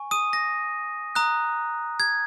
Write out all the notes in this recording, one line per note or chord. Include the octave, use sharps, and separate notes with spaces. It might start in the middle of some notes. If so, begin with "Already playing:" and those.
Already playing: G#5 C#6
D#6 D#7
A#6
A#5 D#6 F#6
G#6